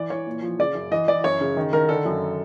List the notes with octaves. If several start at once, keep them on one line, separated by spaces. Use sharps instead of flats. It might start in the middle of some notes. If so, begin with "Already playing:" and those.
Already playing: E3 D5
E3 C#5
A#2
F3
C#3 D5
F#2
E3 D#5
E3 D5
F#2 C#5
C#3
D#3
D#3 A#4
D3 A4
F#2